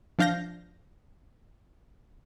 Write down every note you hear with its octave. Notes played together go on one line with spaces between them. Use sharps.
F3 D4 F5 G6 A#6